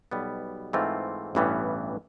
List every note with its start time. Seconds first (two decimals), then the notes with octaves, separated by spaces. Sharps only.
0.11 B1 B2 G3 B3
0.73 G#2 E3 A3 C4 F4
1.35 A1 G2 E3 G3 B3